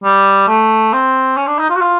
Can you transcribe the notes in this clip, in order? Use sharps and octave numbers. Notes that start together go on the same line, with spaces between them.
G3
A3
C4
C#4
D4
D#4
F4
F#4
F4